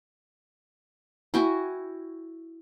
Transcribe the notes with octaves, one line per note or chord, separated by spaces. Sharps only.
E4 F#4 G5 G#5